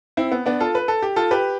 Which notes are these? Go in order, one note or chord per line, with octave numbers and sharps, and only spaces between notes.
C4 E4
B3
B3 D4
F4 A4
B4
A4
G4
F4 A4
G4 B4